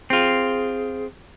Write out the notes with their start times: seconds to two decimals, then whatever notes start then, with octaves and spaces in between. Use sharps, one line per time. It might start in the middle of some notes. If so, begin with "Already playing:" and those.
0.10 C4 F4 G#4